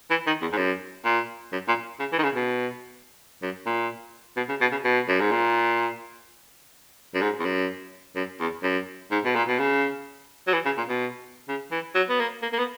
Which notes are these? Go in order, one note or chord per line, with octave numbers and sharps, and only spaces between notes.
E3
D#3
E2
G#2
F#2
A#2
F#2
A#2
C#3
E3
D#3
C#3
B2
F#2
A#2
B2
C#3
B2
C#3
B2
F#2
G#2
A#2
F#2
G#2
E2
F#2
F#2
E2
F#2
G#2
B2
A#2
B2
C#3
F#3
E3
C#3
A#2
B2
C#3
E3
F#3
B3
A#3
A#3
A#3
B3